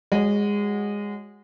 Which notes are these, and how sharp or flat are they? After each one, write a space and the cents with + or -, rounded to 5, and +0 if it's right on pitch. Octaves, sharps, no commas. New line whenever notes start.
G#3 -20 F#4 +0 C#5 +0